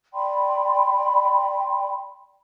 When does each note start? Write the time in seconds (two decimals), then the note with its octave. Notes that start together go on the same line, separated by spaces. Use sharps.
0.14 D5 G5 B5 C6